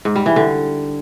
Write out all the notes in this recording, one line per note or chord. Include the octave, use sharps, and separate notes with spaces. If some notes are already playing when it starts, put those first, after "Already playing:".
G#2
G3
E3
D3